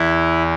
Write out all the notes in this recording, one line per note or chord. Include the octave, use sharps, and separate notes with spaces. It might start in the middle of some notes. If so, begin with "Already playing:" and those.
Already playing: E2 E3 E4